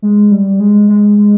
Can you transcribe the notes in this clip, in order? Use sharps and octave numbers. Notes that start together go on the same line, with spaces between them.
G#3
G3
G#3
G#3
G#3